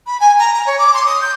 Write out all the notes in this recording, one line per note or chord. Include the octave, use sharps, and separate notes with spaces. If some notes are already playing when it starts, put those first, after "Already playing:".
B5
G#5
A#5
A#5
C#5
D6
C6
D#6
G6